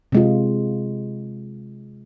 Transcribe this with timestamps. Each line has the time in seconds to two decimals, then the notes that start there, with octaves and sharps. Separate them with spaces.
0.12 C3 G#3 F4